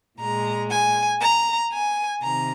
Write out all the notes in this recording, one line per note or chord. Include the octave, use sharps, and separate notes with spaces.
A#2 G#3 A#5
G#5
A#5
G#5
C3 D#3 A#5